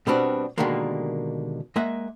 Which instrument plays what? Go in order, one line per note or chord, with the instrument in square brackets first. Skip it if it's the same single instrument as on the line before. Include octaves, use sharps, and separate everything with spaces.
[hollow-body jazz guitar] B2 G3 B3 C4 D4 F#4
B2 D3 D#3 G3 G#3 A#3
G#3 A#3 D#5 E5 F#5